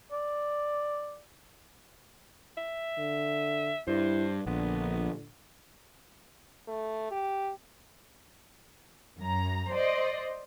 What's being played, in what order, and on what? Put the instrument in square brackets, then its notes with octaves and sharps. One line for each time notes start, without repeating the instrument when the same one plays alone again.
[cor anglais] D5
[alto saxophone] E5
[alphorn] D3
[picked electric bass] G2 [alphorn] E4 [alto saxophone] C5
[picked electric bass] A#1 [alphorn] D3 [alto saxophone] B3
[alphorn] A3
G4
[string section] F#2 A#5
C5 D5 D#5